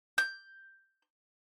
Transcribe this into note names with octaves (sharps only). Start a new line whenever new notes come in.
G6